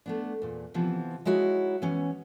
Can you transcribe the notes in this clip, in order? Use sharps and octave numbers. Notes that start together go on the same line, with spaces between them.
A3 B3 D4
E2 A#2
C3 E3 F3 B3
G#3 D#4 E4 F#4 C#5
E3 B3 C#4